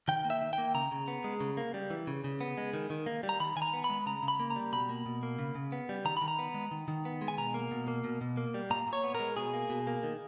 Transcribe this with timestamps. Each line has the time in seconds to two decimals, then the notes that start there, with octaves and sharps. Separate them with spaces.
0.08 D#3 G5
0.25 A#3
0.30 E5
0.41 D#3
0.53 G5
0.58 A#3
0.74 C#3 A#5
0.92 C#3
1.08 B3
1.24 G#3
1.41 C#3
1.57 A#3
1.74 G3
1.90 E3
2.07 C#3
2.24 C#3
2.41 B3
2.58 G#3
2.74 D#3
2.90 D#3
3.06 A#3
3.23 G3
3.29 A#5
3.40 D#3 B5
3.56 D#3 G#5
3.62 A#5
3.73 B3
3.84 B5
3.90 G#3
4.06 C#3 A#5
4.23 C#3
4.28 B5
4.40 A#3
4.51 A#5
4.56 G3
4.72 B2 B5
4.89 A#3
5.06 B2
5.23 A#3
5.39 C#3
5.55 C#3
5.72 B3
5.89 G3
6.05 D#3 A#5
6.17 D#3 B5
6.28 A#5
6.39 B3
6.54 G#3
6.71 D#3
6.88 D#3
7.05 B3
7.21 G#3
7.28 G#5
7.38 B2 A#5
7.54 A#3
7.71 B2
7.88 A#3
8.04 B2
8.21 B2
8.37 A#3
8.54 G3
8.70 A#2 A#5
8.87 A#2
8.93 C#5
9.04 B3
9.15 A#4
9.20 G#3
9.37 B2 G#4
9.53 A#3
9.70 B2
9.87 A#3
10.03 D#3